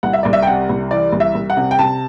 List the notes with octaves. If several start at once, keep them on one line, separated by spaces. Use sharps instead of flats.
C2 F#5
E5
C2 D5
E5
G5
C3 F#5
C2
E3 D5
C2
E5
C2
F#5
C3
G5
C3 A5